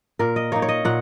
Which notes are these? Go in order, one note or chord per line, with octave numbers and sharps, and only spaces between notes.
A#2 A#4
D#5
A#3 D#4 C#5
C#5
D#5
A#2 F#5